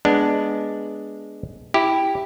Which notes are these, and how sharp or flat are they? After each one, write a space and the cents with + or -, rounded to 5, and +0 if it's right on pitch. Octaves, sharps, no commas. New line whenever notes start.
G#3 +0 B3 -5 D4 +0
E4 +0 G4 +0